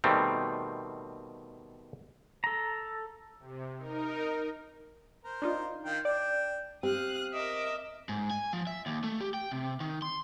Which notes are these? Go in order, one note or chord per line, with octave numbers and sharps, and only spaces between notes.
B2 D#3 G3 A3 C4
A4 A#5
C3
D#4 A#4
A#4 C5
D4 D#4 F4
D#3 F4 G5
D4 D5 G5
C4 G4 F5 D#6 F#6
A#4 D#5 E5 D6
G#2
G#5
F3
E5
D#2
A3
G4
G5
C3
D#3
C6